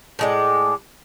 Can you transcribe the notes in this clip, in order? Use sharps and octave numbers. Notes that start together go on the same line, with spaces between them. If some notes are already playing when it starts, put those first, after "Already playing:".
A2 G#3 D5